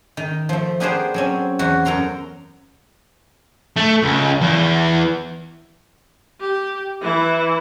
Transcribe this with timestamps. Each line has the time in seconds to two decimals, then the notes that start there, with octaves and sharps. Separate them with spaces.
0.17 D#3
0.49 F3 A3
0.80 B3 D4 G4 G#4 A#4 C5
1.14 F#3 C4 C#4
1.59 E2 F#4
1.85 F#2 A4 A#4 A#5 C6
3.76 A3
4.02 C#2
4.41 E2
6.41 G4
7.02 E3 E4